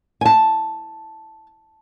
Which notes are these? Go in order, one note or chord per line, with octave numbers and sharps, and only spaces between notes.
G#5 A5